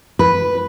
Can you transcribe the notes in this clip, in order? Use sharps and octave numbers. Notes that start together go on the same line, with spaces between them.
B4